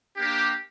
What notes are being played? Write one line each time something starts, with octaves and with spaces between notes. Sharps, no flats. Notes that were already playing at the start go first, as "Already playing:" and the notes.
A#3 D4 G4